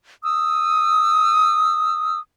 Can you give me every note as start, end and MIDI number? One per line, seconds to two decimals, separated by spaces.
0.23 2.19 87
0.23 2.19 88